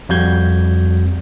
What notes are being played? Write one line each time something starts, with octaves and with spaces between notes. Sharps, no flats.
F2 G3 F#4 G6 G#6